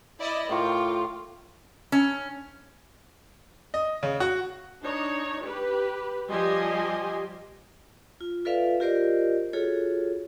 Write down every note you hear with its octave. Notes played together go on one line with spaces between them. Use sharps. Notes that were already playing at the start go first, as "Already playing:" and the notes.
E4 D5 D#5
A2 F4 A#4 G5 C#6 D6
C#4
D#5
C#3
F#4
D4 D#4 C#5
G4 B4
F3 G3 G4 D#5 G#5 C6
F4
F4 A4 B4 D5 E5 F5
F4 G4 A#4 C5 D5 D#5
F4 F#4 G#4 A4 C#5